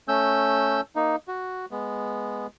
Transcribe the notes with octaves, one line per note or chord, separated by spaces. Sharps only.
A3 C#4 E6 G6
A#3 D#4
F#4
G#3 B3